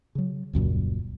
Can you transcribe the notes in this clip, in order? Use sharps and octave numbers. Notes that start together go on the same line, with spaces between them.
C#3 F#3
D#1 C#2 F#2 A#2